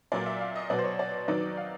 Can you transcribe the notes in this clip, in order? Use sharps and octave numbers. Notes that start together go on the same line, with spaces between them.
A#2 F#3 A#3 D5
E5
F5
D#5
B2 F#3 B3 D5
C5
C#5
D5
D#3 F#3 B3 D#4 D5
F5